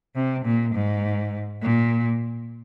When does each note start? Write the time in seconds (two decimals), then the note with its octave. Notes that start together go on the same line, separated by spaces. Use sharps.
0.15 C3
0.45 A#2
0.74 G#2
1.62 A#2